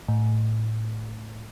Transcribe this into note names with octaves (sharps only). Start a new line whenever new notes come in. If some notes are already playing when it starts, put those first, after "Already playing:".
A2